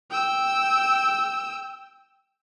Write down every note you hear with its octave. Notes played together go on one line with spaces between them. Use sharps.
G5 E6